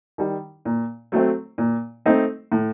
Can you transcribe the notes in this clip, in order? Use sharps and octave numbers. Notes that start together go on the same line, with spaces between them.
D#3 G3
A#2
F#3 A3 C4
A#2
A3 C4 D#4
A2